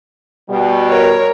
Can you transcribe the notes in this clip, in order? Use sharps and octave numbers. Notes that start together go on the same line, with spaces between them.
B2 G3
A#4 C#5